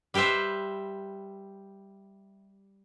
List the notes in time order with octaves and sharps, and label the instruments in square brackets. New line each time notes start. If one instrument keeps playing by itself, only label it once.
[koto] G3 G4 B4 C5 E5